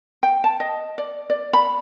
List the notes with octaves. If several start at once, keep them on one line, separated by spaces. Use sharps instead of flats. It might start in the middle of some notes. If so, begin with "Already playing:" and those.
G5
A5
D#5
D5
D5
B5